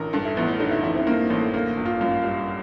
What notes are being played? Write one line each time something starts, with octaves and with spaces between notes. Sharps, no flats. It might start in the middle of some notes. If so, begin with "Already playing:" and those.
Already playing: A1 D3 A#4
G2 A4
E4
A1 B3
A3
D3 D#4
E4
A1 E4
C4
G2 A#3
A1 A3
D3 A#3
G1
F4
F#2 F4
G3